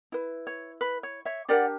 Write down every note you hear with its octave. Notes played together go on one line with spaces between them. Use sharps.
E4 B4
C#5
B4
C#5
C#5 E5
D4 G4 A#4 D5 F#5